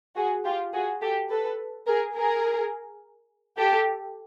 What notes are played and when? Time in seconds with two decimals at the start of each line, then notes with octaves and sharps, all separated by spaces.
0.16 F#4 G#4
0.45 F4 G4
0.73 F#4 G#4
1.01 G4 A4
1.30 A4 B4
1.87 G#4 A#4
2.15 G#4 A#4
3.58 G4 A4